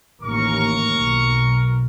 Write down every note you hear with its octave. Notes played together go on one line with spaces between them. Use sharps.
A1 D#2 A#4 C#6
B1